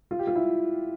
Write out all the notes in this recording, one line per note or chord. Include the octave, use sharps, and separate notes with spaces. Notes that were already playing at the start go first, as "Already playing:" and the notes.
F4
G4
F4
E4